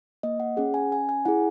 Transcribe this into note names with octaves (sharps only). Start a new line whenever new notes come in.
A#3 D#5
F#5
C#4 G#4 F#5
G#5
C#4 G#5
G#5
E4 G#4 F#5